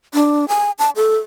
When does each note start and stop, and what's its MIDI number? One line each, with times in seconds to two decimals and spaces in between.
0.14 0.48 62
0.48 0.71 80
0.79 0.90 81
0.96 1.17 69